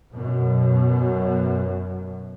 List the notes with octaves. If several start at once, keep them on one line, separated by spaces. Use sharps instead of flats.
F#2 B2